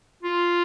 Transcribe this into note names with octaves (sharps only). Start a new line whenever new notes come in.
F4